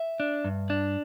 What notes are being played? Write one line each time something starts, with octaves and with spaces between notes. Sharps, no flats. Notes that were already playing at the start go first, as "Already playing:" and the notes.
Already playing: E5
D4
G2
D4